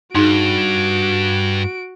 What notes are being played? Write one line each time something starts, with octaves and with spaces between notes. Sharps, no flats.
G2 D#4 F#4 G#4 D7